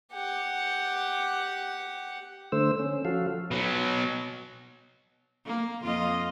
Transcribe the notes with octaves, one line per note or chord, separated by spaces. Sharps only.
G4 F#5
D3 A3 C5 E6
C#4
F3 F#4 A4 F5
B2 F#3
A#3
F2 F4 D#5